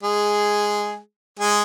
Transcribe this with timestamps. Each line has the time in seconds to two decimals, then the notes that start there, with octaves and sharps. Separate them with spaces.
0.03 G#3 G#4
1.39 G#3 G#4